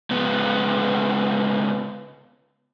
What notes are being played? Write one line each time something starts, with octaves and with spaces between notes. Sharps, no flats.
C#2 B3